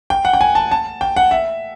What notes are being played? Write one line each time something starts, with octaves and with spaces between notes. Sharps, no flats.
G5
F#5
G5
G#5
A5
A5
G5
F#5
E5